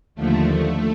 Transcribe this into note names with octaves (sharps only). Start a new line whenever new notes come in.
D#2 D3 F3 A3